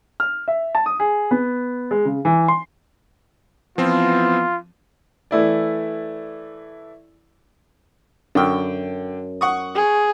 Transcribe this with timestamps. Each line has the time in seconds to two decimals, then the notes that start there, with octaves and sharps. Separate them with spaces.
0.20 F6
0.48 E5
0.75 A5
0.86 D#6
1.00 G#4
1.31 B3
1.91 G#3
2.05 C#3
2.25 E3
2.48 C6
3.78 E3 F3 B3 C4 F4
5.31 E3 A3 E4 D5
8.35 F#2 D3 G5
9.41 F#5 C#6 D#6
9.75 G#4